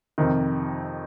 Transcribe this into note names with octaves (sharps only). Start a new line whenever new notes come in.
F2 C3 D#3